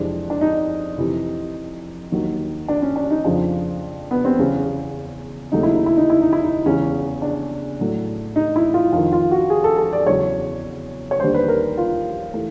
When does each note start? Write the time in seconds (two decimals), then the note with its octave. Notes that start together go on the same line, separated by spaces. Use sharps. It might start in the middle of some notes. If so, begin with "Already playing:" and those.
Already playing: F2 C3 E3 G#3 D4
0.30 D4
0.41 D#4
0.98 F2 C3 E3
2.12 D#2 D#3 F#3
2.68 D4
2.82 C#4
2.96 D4
3.11 D#4
3.25 F2 C#3 F3 D4
4.11 B3
4.25 C4
4.39 E2 C#3 F#3 C#4
5.52 D#2 C#3 F#3 A3 D#4
5.63 E4
5.75 D#4
5.86 E4
5.97 D#4
6.10 E4
6.21 D#4
6.33 E4
6.43 D#4
6.66 E2 C#3 E3 G#3 C#4
7.22 D4
7.80 A2 F#3 A3
8.36 D#4
8.56 E4
8.74 F4
8.92 F2 C3 D#3 F4
9.12 F4
9.31 F#4
9.50 G#4
9.64 A4
9.78 A4
9.93 D5
10.06 E2 C#3 F#3 C#5
11.11 C#5
11.20 D#2 D3 G3 C5
11.34 B4
11.48 A#4
11.78 F4
12.34 E3 A3